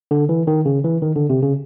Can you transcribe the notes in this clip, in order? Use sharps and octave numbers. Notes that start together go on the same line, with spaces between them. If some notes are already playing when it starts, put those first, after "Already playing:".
D3
E3
D#3
C#3
E3
D#3
D3
C3
C#3